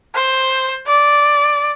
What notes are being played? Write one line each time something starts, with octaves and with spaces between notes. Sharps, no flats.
C5
D5